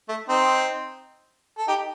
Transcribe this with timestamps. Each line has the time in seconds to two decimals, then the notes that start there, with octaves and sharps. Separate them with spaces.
0.09 A3
0.29 C4 D#4
1.58 A4
1.68 D#4 G4